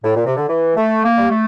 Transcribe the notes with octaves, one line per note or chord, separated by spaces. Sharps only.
A2
A#2
C3
D3
E3
A3
A#3
G3
A3